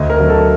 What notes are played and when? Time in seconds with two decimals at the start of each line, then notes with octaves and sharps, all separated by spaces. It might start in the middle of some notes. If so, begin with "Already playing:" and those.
Already playing: D2 D#5
0.10 A#4
0.19 D3 F#3 A3
0.29 A4